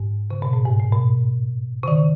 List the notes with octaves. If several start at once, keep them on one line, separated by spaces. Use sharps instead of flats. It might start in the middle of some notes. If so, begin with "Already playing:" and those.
Already playing: G#2
C#3
B2
A2
G#2
A2
B2
C#3
D#3